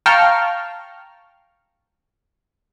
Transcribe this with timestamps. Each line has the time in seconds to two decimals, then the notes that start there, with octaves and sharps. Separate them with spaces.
0.06 F5 G5 A5 A#5 C#6 F6